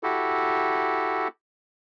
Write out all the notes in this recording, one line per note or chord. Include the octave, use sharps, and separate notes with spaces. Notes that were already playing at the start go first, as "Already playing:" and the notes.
E4 F#4 G4 A4